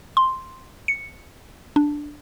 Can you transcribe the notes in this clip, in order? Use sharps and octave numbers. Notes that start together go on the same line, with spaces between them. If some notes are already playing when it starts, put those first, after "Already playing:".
C6
C#7
D4